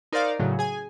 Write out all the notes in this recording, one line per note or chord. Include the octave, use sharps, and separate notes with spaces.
D#4 A#4 C5 D5 F5
A2 C#3 F#3
G#4 G#5